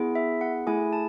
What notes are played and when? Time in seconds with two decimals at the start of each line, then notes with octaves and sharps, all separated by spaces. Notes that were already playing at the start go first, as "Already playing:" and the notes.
Already playing: B3 E4 G#4
0.15 E5
0.41 F#5
0.67 A3 E4 G#4 G#5
0.93 A5